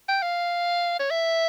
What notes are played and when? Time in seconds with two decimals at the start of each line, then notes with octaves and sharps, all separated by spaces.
0.08 G5
0.22 F5
1.00 C#5
1.11 E5